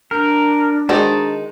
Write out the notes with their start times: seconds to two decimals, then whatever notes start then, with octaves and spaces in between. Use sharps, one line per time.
0.11 D4 A#4 F6 G6
0.89 D#3 G#3 D#4 F#4 G#4 C5 A5